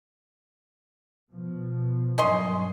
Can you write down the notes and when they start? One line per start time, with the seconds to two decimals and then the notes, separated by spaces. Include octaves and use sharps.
1.32 B2 F3
2.18 G2 F#3 C#4 D#5 C6